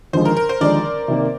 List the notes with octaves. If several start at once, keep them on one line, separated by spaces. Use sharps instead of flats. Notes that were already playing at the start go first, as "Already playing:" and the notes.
D#2 D3 F3 G#3 C5
A#4
A#4
C5
D#2 D3 F3 G#3 D5
C3 D#3 A#3